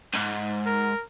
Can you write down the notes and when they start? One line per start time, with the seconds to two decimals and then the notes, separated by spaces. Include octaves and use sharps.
0.13 C2 G#2
0.66 A#4